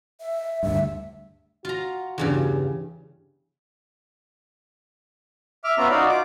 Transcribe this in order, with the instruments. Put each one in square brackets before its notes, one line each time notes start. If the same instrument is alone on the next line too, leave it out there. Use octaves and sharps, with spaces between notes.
[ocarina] E5
[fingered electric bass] D2 G2 [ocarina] E5
[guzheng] F4 A#5 [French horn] F#4
[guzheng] E2 G2 C#3
[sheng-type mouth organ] E5 D6 F6
B3 C#4 F4 E5 A#5
D#4 F#4 D5 F5
F4 D6